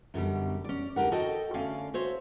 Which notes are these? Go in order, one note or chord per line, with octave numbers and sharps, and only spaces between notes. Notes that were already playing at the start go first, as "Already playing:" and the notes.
F#2 B2 D3 G3
C#4 D5
D2 D3 G4 A#4 F#5
F#4 A4 D#5 G5
D3 A3 C#4 D5 F5
F#4 C5 C#5 E5